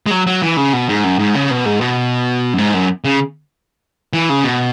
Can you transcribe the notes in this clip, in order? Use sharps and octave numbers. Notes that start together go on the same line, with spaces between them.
G#3
F#3
F#3
E3
C#3
B2
G#2
F#2
G#2
C#3
B2
G#2
B2
F#2
G#2
F#2
C#3
E3
C#3
B2